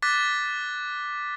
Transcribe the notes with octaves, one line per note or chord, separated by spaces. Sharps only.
D6 F#6 A6 B6